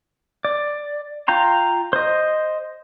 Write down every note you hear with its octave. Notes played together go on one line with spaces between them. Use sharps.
D5
F4 G5 A#5 C6
C5 D#5